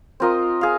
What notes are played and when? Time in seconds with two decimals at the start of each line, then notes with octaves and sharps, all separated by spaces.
0.20 C4 F4 A#4 D#5
0.61 G#4 F5